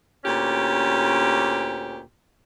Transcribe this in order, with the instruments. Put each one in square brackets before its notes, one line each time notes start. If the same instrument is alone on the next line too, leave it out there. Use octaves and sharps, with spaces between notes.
[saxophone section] D2 A#2 C#4 G4